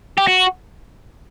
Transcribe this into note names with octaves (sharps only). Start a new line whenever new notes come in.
G4
F#4